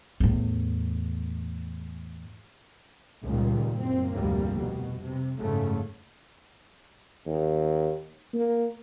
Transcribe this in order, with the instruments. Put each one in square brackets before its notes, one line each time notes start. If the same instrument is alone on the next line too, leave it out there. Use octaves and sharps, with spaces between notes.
[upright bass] E2 A2
[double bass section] C#2 A#2 D#3 G3
F#1 C4
F1 D2 G#2 G3 A#3
B2
C3
F#1 G#2 C#3 A3
[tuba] D#2
A#3